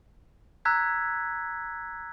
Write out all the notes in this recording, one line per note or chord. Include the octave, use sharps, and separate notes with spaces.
A#5 E6 F#6 G#6 B6